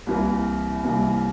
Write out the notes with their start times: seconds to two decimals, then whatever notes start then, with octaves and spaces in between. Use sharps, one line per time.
0.07 C2 C3 E3 A#3
0.84 C2 C3 E3 A#3